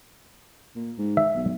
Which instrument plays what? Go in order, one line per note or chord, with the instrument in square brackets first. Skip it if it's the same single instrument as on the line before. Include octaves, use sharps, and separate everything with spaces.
[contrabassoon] A#2
G#2
[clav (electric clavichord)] E5
[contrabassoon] B1